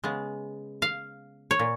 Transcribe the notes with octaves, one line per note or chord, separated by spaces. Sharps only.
C#3 G#3 B3
F5
C#5
A#2